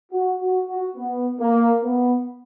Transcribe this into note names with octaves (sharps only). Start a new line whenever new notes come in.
F#4
F#4
F#4
B3
A#3
B3